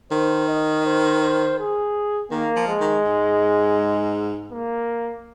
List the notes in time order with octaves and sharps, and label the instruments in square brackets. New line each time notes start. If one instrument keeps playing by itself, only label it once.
[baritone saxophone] D#3 [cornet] C5
[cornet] D#5
C5
C5
G#4
[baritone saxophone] D#3 [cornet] A#3
[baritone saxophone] F3
[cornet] G#3
[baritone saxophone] D#3
G#2
[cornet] A#3